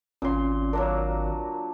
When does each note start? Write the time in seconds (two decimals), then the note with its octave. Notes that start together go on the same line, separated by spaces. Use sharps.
0.22 G#1 A#2 C#4 C6
0.73 F#3 A#3 D4 A#4